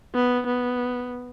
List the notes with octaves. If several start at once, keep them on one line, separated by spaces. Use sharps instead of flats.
B3
B3